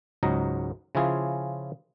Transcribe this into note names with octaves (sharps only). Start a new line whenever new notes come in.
C#2 G#2 F#3 D#5 A#5
C#3 F3 C#4 E4 F4 G#4